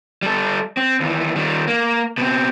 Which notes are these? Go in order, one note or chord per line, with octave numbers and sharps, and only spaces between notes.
G3 A4
C4
D#2 E3
D#3 G3
A#3
B2 C4